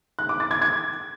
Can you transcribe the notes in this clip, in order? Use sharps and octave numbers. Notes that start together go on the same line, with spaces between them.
F#6
D6
A6
G#6
G#6